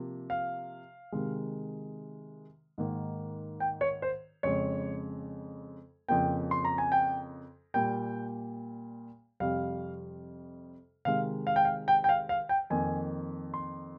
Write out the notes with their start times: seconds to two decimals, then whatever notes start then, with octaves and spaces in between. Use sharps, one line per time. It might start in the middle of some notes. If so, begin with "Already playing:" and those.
Already playing: C3 F3 A#3
0.30 F5
1.12 C3 D#3 G#3
2.78 G#2 D#3 A#3
3.60 G5
3.81 C#5
4.02 C5
4.43 F2 C#3 G#3 C#5
6.09 F2 C#3 F3 A#3 G5
6.51 C6
6.65 A#5
6.78 G#5
6.92 G5
7.74 A#2 G3 A#3 G5
9.40 F2 C3 G3 F5
11.05 C3 D#3 G#3 F5
11.47 F5
11.56 G5
11.65 F5
11.88 G5
12.04 G5
12.09 F5
12.29 F5
12.49 G5
12.70 F2 D#3 A#3 G#5
13.54 C6